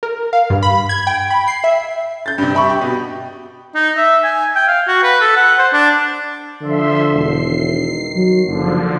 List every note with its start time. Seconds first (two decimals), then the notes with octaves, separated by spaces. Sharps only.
0.03 A#4
0.33 F5
0.50 G2
0.63 B5
0.89 G#6
1.07 G5
1.30 B5
1.48 C7
1.64 E5
2.26 G6 A6
2.38 G2 C3
2.55 E5 B5 C#6
2.70 G4
2.81 B2
3.75 D#4
3.97 E5
4.24 G#5
4.55 G5
4.67 F5
4.87 F#4
5.03 B4
5.21 A4
5.36 F#5
5.58 C5
5.73 D4
6.62 D3 F3 E5 C6
7.13 E1 C7
7.47 D#3
8.15 F#3
8.46 F#1 D3 F3